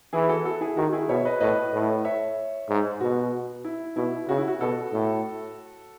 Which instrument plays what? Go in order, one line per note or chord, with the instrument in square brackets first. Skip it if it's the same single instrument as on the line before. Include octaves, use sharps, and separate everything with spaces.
[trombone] E3 [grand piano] E4 G#4
[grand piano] F#4 A4
F#4 A4
E4 G#4
[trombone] D#3 [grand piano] F#4
[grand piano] F#4
E4 G#4
[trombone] B2 [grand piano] C#5 E5
[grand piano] B4 D#5
[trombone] A2 [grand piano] B4 D#5
[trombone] A2
[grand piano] C#5 E5
[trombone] G#2
[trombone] B2 [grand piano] F#4
[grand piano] E4
[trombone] B2 [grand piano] E4
[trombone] C#3 [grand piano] F#4
[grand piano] E4
F#4
[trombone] B2 [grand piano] F#4 A4
[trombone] A2